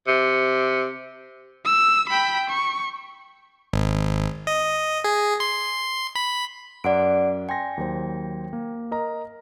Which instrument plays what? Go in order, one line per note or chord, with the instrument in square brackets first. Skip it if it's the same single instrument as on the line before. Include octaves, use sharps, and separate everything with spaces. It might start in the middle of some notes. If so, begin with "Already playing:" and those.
[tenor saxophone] C3
[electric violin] E6
G5 B5
C#6
[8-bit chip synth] G#1
D#5
G#4
C6
B5
[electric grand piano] F#2 [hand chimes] D5 F#5 D7
[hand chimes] G5 [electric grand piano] G#5 C6 A#6
[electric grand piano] D#2 F#3 C5
A#3
A#4 D#5 A#5